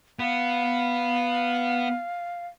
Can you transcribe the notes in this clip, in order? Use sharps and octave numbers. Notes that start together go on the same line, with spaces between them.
B3 F5